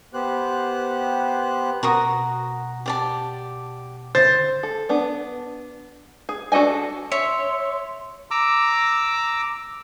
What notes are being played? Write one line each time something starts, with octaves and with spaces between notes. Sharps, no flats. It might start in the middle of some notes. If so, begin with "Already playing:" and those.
B3 G4 C5 F#6
B2 F#4 A#4 F#5 D#6
G4 D5 A5
D3 C5 A6
A4
B3 D4
G#4
D4 F#4 A4 D#5 G#5
C#5 E5 C6
A#5 D6 E6